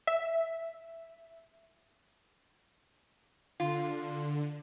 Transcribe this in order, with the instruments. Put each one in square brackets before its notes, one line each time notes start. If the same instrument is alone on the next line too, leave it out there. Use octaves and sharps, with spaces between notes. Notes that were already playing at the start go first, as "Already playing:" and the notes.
[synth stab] E5
[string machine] D3 [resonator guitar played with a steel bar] F4